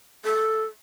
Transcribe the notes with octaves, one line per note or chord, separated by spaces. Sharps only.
A4